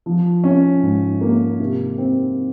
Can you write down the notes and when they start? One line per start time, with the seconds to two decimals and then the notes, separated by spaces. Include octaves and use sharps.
0.06 F3
0.44 C#4
0.83 G#2
1.21 A#3
1.59 C3
1.98 C4